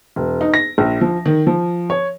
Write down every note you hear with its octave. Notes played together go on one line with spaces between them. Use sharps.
E1
D#4
A#6
A#1
F3
D#3
F3
C#5